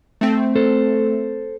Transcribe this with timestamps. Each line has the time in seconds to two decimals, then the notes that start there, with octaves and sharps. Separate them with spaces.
0.21 A3 C4
0.56 A4 C5